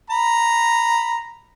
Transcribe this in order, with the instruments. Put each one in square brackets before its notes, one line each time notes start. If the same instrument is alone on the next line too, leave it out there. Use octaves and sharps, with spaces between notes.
[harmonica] A#5 B5